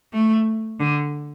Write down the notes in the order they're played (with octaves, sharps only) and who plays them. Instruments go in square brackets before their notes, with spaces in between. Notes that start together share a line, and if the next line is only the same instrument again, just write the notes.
[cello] A3
D3